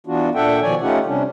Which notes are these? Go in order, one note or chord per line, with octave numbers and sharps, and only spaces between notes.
E3 B3 D4 F4 F#4
A#2 D4 A4 E5 F#5 G5
B2 D#3 F3 C#5 D5 G#5
A3 C#4 D#4 F4 G4 F#5
C3 G3 C#4 D4